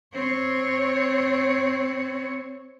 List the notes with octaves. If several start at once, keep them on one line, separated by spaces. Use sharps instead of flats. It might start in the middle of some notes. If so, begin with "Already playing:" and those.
C4 C#5